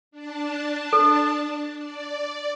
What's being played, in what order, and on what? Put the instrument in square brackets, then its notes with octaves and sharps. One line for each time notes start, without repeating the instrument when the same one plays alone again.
[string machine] D4 A5
[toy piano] A4
[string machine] D5